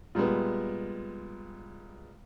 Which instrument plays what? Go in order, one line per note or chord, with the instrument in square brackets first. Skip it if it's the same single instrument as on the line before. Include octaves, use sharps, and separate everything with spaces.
[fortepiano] A#2 G3 G#3 B3